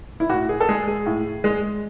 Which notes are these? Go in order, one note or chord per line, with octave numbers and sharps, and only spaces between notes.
E4
A2 F#4
G#4
A4
G#3 G#4
G#4
A2
G#3